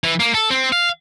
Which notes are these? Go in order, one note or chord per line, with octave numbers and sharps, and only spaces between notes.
E3
A#3
A4
C4
F5